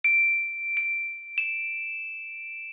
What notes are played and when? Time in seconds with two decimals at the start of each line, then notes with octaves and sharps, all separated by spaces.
0.04 D7
0.77 D7
1.38 E7